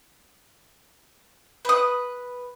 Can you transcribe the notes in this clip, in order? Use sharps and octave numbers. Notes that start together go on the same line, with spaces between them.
B4 D#6